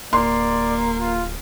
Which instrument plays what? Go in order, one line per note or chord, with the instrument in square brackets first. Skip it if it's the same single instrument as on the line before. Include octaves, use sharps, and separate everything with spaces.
[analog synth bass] D1 [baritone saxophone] A#3 [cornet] D5 [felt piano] C6
[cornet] F4